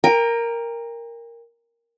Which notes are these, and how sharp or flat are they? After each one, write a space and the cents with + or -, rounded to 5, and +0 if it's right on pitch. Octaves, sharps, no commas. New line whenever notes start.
A#4 +0 G5 +40